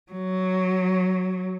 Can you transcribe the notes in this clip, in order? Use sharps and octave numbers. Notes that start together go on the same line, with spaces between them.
F#3